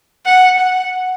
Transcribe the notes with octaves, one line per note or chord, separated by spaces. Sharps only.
F#5
F#5